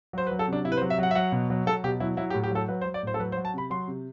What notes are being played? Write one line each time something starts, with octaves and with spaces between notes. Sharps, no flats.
F#3 C5
B4
F#3
A4
C3 D4
C3 E4
B4
C5
F#3
E5
F#3 F#5
E5
F#3 F#5
B2
F#3
F#3 A4
B2 G4
F#3 E4
F#3 E4
G4
A2
G4
F#3 A4
F#3 B4
C5
F#3
D5
A2 C5
A4
F#3 B4
C5
F#3
A5
C3 B5
F#3 C6
C3